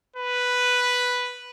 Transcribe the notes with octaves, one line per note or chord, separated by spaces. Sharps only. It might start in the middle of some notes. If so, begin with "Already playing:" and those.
B4